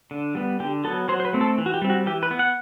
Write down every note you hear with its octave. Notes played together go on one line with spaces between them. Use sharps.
D3
G3 B3
D3 G4
F#3 B3 A4
F#3 C5
C5
B4
A3 C4
A4
E3
F#4
G4
G3 C4
F#4
E3 G4
B4
B3
F#5